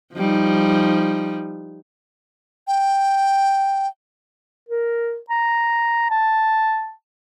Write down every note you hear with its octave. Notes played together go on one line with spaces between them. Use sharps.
F3 G3 D#4
G5
A#4
A#5
A5